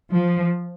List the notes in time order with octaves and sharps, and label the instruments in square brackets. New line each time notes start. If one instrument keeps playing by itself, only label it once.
[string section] F3